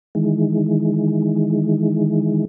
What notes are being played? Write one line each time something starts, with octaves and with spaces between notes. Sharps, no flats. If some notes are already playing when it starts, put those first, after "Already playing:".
D#3 E3 G#3